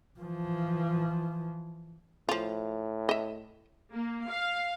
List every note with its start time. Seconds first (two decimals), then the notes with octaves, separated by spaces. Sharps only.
0.20 E3 F3
2.29 A2 F3 F4
3.09 D#5 E5
3.93 A#3
4.27 F5